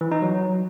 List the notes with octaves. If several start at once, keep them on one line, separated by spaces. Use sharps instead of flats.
E3
D#4
F#3